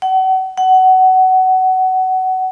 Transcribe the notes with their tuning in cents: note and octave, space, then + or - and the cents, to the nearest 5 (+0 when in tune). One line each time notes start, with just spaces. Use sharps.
F#5 +35
F#5 +20